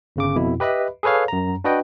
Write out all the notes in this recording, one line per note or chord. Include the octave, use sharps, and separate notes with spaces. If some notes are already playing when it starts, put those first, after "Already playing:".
G1 C#3 D6
F2 B2 E4
G4 B4 D#5 E5 B5
G#4 A4 B4 C#5 F5
F#2 A#5
D4 F#4 B4 D#5 G5